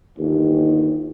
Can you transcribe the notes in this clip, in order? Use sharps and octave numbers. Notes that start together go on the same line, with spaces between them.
G1 D#2